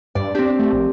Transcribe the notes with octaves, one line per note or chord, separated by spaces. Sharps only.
G2 D5
C4 D4 G4
A3
A#1